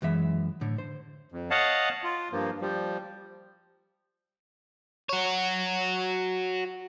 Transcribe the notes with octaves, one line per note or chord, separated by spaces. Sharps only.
F#2 E3 G#3 E5
A2 D3
C5
F2
C#5 D#5 F5 F#5 A5
F4
G2 F3 A#3
F3 G3
F#4 C#5